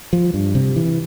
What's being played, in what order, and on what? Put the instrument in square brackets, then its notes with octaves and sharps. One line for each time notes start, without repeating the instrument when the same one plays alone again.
[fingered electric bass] F3
G2
C3
E3